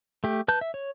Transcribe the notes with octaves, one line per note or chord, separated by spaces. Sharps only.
A3 G4
B4 A5 G6
E5
C#5